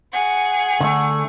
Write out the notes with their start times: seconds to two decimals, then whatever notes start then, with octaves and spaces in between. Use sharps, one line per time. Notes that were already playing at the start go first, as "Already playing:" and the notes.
0.13 G#4 F#5 C#6
0.80 D3 A3